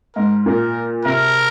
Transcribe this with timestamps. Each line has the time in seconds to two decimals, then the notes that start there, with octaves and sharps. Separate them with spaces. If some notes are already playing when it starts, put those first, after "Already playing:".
0.15 G#2 A#4
0.45 A#2 A#4
1.05 C3 A#4